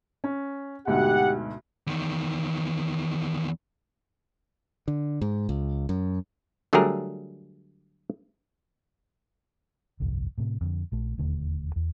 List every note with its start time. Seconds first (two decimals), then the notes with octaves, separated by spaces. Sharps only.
0.24 C#4
0.87 D2 G#2 B2 G4 F#5
1.87 E2 D#3
4.88 D3
5.21 G#2
5.49 C#2
5.89 F#2
6.73 D3 F#3 G3 A3 G#4 A#4
10.00 G1 C2 F2
10.38 A2 C3
10.61 F2 D3
10.92 A#1 A3
11.18 E1 D#2 D3 A3
11.76 E2